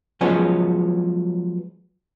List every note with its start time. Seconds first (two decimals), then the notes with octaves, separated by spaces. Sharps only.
0.21 F3 F#3 G#3 B3 C#4 G#4